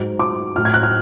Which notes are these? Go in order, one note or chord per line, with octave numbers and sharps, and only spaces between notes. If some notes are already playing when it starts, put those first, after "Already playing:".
Already playing: G#2 F#3
D6
A2 F#3 F6
G#6
F#6
F6